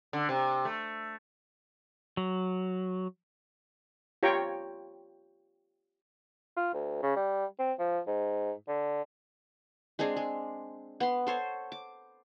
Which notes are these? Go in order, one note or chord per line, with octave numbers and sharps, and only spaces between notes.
D3
C3
A3
F#3
F4 G4 C#5 G5 A#5 C#6
F4
D2
C#3
G3
C4
F3
G#2
D3
G#3 C4 D4 G#4
G#3
B3 C6
A4 C5 C#5
D6